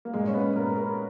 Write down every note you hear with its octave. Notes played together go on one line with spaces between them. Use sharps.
A#3
A#2 G#3
C#4
B3
A#2 A#4
A#4